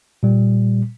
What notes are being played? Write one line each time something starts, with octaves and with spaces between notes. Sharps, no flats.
A#2 G3